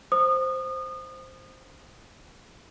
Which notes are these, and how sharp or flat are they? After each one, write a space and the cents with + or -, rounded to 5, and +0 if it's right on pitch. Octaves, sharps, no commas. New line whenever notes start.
C5 +0 D#6 -30